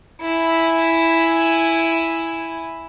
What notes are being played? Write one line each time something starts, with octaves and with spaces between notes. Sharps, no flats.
E4 G#5